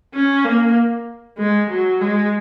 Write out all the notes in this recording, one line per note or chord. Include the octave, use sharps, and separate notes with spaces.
C#4
A#3
G#3
F#3
G#3